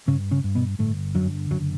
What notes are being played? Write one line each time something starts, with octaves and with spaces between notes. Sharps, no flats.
G2 C#3 C#4
C#3 C#4
G2
B2 B3
G1 A2 A3
F#2 D3 F#3
F#1 F#2 F#3